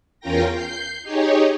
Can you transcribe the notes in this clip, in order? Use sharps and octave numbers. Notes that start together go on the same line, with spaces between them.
E2 C#4 F4 A#4 G5 A#6
G6 C7
D#4 G4 G#4 C#5